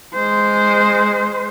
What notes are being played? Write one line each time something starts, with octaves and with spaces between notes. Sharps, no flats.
G#3 C5